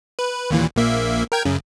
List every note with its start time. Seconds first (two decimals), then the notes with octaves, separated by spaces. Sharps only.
0.19 B4
0.51 D#2 A#2 E3
0.76 A#1 A#3 E5
1.32 A#4 G5 G#6
1.45 F#2 C#3